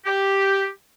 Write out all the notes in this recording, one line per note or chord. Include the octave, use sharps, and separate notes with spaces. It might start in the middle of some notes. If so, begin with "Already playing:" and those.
G4